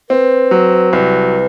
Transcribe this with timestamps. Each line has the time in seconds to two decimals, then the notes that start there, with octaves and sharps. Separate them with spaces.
0.10 C4 B4
0.51 F#3
0.93 C2 B4